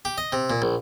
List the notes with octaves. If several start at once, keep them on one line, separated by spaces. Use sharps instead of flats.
G4
D#5
C3
A#2
A#1